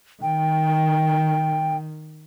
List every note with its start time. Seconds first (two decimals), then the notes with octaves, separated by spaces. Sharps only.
0.22 D#3 G5